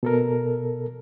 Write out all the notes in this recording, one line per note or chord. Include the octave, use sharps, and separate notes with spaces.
B2 A4 A#4